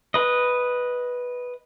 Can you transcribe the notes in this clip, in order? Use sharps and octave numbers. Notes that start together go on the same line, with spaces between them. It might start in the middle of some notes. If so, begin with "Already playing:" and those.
B4 D#5